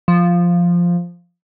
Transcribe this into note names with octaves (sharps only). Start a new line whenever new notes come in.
F3